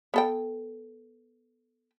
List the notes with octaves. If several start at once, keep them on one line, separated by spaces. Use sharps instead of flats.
B3 A4 G5